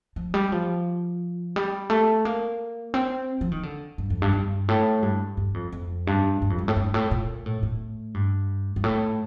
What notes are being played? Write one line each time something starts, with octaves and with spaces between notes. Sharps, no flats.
F3
G3
F3
G3
A3
A#3
C4
F3
D#3
D3
G2
F2
G2
G2
A2
G2
G2
F2
F2
G2
G2
F2
G2
A2
G2
A2
A#2
A2
A2
G2
G2
A2